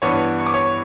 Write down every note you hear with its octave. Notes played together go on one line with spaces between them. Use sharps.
G2 E3 B3 D4 C#5 C#6
C#6
D6
C#5 C#6